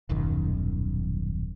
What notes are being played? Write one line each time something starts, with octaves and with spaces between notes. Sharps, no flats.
D#1 B1 F#2 D#3